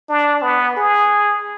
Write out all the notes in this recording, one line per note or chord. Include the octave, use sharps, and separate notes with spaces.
D4
B3
G#4